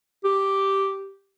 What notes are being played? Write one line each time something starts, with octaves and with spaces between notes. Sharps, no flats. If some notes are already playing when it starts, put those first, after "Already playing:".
G4